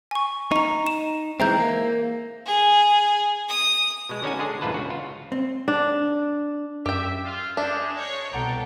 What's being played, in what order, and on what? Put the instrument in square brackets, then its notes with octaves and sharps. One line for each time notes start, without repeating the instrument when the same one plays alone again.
[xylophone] G#5 C#6
[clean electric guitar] D#4 [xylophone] A#5 C#6
[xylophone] E7
[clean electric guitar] E3 G#3 C4 [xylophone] E5 A#5 G6
[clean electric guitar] A#3
[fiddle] G#4
D#6
[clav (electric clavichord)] B2 G#3
D3 C#4 D#4 F#4 G#5
D3 G#3 D4 G#4
A#1 E2 G#2 F4 B4 A5
C#2 F#4
F4
[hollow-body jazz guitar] C4
[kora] D4
[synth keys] F#2 [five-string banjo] G4 G5 [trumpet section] E5
[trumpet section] F4
[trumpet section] G#3 [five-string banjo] D4 [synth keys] E5 A5 G6
[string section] C#5
[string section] C2 B2 A4 [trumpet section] D5 G5 [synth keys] F#5 A#5